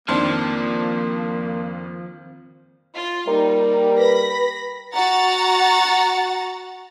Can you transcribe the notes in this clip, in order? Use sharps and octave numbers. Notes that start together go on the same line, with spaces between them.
F2 D#3 F3 A#3 C4 D4 C6 F6
F4 C6
G3 A#3 D#4
B4 B5 A#6 B6
F#4 F#5 A#5 A6